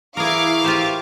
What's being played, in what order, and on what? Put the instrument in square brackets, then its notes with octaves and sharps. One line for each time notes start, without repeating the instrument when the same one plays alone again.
[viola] E3 E4 [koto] G#4 A#4 [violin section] F5 C#6 D6
[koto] F4 G4 C5